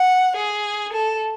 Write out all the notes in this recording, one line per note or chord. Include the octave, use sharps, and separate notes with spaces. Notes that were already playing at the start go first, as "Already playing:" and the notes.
Already playing: F#5
G#4
A4